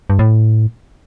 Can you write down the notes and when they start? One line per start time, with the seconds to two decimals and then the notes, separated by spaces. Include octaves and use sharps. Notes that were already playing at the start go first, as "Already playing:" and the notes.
0.10 G2
0.19 A2